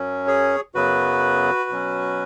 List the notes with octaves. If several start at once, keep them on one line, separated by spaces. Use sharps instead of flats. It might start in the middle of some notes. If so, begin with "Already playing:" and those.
Already playing: F#2 F#3 C#4
G#4 C#5
F#2 C#3 F#3 B3 F#4 B4
B2 F#3 C#4